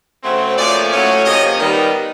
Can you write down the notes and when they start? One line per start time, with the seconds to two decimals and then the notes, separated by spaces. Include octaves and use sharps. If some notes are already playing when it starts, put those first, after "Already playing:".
0.23 C#3 F#3 A3 C4
0.57 A#2 F3 A3 C#4 D5
0.92 A2 F#3 A3 C#4
1.25 C3 F3 A#3 C#4 D#5
1.59 D#3 G3 B3